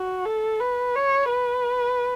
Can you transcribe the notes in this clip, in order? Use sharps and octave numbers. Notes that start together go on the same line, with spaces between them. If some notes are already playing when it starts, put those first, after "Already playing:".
Already playing: F#4
A4
B4
C#5
B4